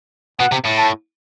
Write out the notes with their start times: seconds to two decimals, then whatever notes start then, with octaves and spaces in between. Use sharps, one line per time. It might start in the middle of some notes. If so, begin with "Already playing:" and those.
0.39 B2 F#5
0.52 C3
0.65 A2
0.77 A5